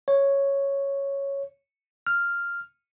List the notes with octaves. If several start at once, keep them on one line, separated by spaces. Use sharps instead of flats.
C#5
F6